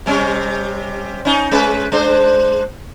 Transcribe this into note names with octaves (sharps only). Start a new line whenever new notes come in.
C3 G3 C#4
C#4 D#4
G#3 C#4 B4
G#3 D4 C5